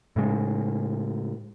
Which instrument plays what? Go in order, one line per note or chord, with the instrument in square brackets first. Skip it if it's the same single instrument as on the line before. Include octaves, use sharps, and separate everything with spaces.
[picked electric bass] A2 C#3 G#3